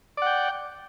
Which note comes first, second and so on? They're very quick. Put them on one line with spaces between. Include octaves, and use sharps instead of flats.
D5 F#5 G5